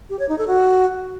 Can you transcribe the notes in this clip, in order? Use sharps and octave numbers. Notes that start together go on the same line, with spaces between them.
G4
C#5
D#4
A4
F#4